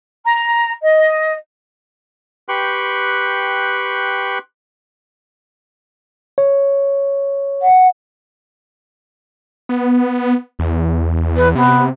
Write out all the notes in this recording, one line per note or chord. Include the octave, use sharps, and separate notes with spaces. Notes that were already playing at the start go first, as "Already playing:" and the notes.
A#5
D#5
G4 B4 G5 C6 C#6 F#6
C#5
F#5
B3
E2
B4
C3 B3